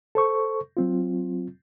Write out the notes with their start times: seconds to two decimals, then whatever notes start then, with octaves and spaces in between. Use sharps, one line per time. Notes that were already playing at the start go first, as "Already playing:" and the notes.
0.15 A4 C5 C#6
0.77 F#3 C4 F4